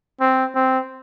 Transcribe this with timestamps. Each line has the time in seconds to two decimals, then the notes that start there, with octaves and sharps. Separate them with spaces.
0.21 C4
0.55 C4